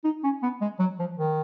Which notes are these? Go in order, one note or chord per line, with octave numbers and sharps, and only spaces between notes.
D#4
C#4
B3
G#3
F#3
F3
D#3